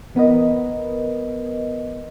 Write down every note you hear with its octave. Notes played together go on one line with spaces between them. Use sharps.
E3 B3 A#4 B4 D#5